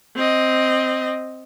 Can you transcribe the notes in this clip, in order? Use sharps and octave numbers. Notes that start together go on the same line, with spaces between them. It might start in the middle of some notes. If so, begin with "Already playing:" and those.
C4 D#5